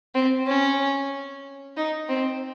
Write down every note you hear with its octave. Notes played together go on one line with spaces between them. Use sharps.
C4
C#4
D#4
C4